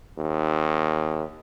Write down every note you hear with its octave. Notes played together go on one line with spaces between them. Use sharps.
D#2